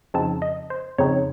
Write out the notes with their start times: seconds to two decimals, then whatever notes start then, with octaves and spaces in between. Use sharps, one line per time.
0.14 F2 C#3 F3 C4 D#4 A5
0.42 D#5
0.70 C5
0.98 F2 C#3 F3 C4 D#4 C#5